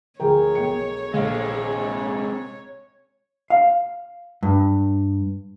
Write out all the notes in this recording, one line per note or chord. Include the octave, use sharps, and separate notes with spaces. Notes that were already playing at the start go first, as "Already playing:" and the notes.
D2 F3 G#4 A#4 C#5 G5
B1 G5 C#7
A#1 C3 G#3 A4 F5
F5
G2